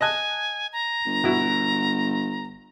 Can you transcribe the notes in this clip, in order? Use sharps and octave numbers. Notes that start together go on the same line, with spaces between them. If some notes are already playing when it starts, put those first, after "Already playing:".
D#5 G#5 A5 F#6
A#5
G1
B2 E4 F#4